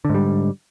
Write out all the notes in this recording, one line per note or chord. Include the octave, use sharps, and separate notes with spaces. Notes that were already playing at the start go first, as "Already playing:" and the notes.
G#2 D3 G3